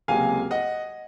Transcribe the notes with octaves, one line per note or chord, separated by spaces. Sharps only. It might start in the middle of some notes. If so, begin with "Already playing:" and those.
C#2 C3 F#3 A#3 F5 G#5
D#5 F#5